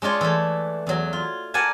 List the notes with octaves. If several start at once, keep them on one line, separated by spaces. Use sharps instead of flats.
G#3 D4 F4 C#5
E3 A3
E2 F#3
F4
A#4 D5 F#5 G#5 A5